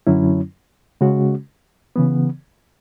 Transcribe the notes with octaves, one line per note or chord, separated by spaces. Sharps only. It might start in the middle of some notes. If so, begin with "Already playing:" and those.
F#2 D3 F#3 C#4 E4
C#3 G#3 C#4 F#4
C#3 E3 B3